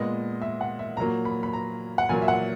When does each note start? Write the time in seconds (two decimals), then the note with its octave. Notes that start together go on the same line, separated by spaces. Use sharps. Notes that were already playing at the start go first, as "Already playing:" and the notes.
Already playing: A#2 G#3 B3 D#5
0.42 E5
0.61 F#5
0.79 E5
0.97 A#2 F#3 A#3 A#5
1.25 B5
1.43 B5
1.53 A#5
1.98 F#5
2.09 A#2 F#3 A#3 G#5
2.22 E5
2.28 F#5